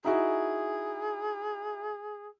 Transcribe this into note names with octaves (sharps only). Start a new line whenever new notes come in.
D#4 E4 F#4 G#4